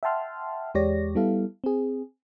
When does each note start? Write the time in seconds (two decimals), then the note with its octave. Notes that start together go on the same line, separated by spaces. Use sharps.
0.03 E5 F#5 G5 A5 C6 F6
0.75 E2 G#3 G4 C#5 D5 A#6
1.15 G3 B3 E4 A4 F5
1.64 C4 G#4